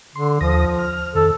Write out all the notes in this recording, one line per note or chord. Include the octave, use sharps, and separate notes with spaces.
D3 C6
D#2 F3 D#6 A#6
F6
F2 D#3 A4